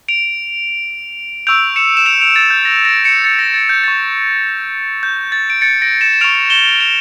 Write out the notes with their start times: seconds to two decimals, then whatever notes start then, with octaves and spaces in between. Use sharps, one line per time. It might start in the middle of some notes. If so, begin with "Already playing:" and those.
0.08 D7 F7
1.47 C#6 E6 G6 D7 F7
1.76 C#7 E7
1.97 E7
2.06 D7 F7
2.21 D7 F7
2.36 A6
2.50 G6
2.65 A#6
2.85 A#6 D7
3.04 C#7 E7
3.24 A6 C#7
3.39 A#6
3.54 A6
3.69 G6
3.84 C#6 G6 A6
5.03 G6
5.32 A6
5.50 D7
5.61 A6 C#7
5.82 A#6 D7
6.01 C#7 E7
6.13 E7
6.21 C#6 F6 D7 F7
6.50 E7 G7
6.80 D7 F7